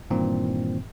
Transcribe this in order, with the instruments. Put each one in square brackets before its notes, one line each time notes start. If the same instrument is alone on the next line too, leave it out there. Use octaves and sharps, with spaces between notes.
[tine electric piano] G2 A#2 D#3 E3 C4